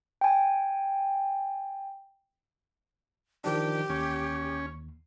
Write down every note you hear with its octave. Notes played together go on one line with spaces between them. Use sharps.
G5 G#5
D#3 F3 D4 G4
D#2 C#4